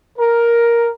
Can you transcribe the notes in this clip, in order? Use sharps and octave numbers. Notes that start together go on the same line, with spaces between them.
A#4